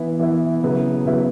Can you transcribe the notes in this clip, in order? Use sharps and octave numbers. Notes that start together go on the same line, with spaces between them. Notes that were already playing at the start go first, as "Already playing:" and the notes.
Already playing: E3 B3 E4 B4
E3 B3 E4 B4
C#3 F#3 B3 E4 B4
C#3 F#3 B3 E4 B4